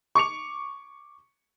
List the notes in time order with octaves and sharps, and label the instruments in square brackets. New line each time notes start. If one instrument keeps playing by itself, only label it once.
[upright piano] C#6 D6 C#7 F7